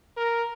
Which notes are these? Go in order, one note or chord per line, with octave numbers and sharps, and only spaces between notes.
A#4